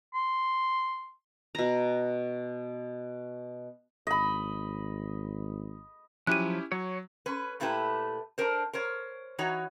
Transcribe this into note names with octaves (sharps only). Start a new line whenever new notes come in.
C6
B2 A#5
G#1 D#5 B5
F3 F#3 C#4 E4 G4 F#6 D#7
F#3 C#5 C#6
C#4 B4
A#2 A3 E4 G4 B4
D4 A#4 C5
A#4 C5 C#5
E3 D#4 F#4 C#5